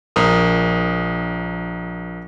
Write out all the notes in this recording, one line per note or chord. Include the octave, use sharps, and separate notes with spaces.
A#1 A#4 D#6